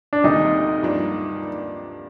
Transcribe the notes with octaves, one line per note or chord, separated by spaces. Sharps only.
D4
D2 C3 D#3 G3 A#3 D#4
G2 F3 A#3 D4